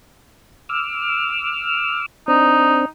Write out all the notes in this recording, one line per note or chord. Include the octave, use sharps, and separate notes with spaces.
D6 E6 F6
C4 D4 D#4